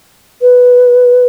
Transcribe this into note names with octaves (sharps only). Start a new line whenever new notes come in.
B4